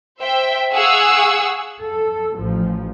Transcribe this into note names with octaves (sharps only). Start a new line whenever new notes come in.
C5 E5 G5
G#4 F5 F#5 C#6 E6 G#6
A4
A1 F3